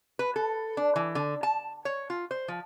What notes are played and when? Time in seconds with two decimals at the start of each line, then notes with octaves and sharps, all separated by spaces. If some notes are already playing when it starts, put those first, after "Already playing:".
0.19 B4
0.36 A4
0.77 D4
0.96 E3
1.15 D3
1.43 A5
1.85 C#5
2.10 F4
2.31 C5
2.48 F3